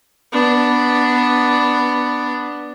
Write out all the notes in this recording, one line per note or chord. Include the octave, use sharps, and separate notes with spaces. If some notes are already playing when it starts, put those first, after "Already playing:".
B3 D4